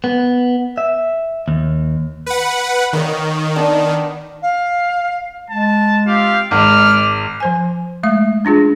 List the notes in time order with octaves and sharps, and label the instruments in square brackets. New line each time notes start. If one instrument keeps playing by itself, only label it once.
[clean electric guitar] B3
E5
D#2
[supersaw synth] B4 F#5
[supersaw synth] D#3 [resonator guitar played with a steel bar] A#3 C#5
[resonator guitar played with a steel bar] B3 D4
[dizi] F5
[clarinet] G#3 [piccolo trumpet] A5
[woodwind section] C4 F4 G4 [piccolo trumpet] F5
[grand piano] G#1 [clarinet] G#3 [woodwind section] D6 [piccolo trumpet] F6
[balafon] F3 C5 G#5
G#3 A3 E5
C#4 D4 F4 G#4